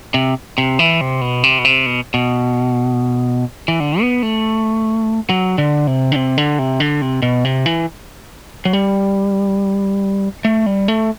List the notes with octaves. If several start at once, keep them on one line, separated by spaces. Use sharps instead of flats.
C3
C3
E3
C3
B2
C3
B2
C3
B2
B2
E3
D3
B3
A3
F#3
D3
C3
D3
C3
D3
C3
D3
C3
B2
C3
E3
F#3
G3
A3
G3
A3